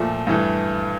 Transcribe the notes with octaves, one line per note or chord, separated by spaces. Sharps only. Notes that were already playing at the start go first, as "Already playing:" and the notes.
Already playing: A#2 F3 A3
G2 E3 A3